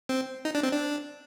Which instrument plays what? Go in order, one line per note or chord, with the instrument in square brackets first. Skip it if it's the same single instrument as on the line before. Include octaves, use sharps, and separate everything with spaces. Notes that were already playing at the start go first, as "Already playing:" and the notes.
[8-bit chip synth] C4
D#4
D4
C4
D4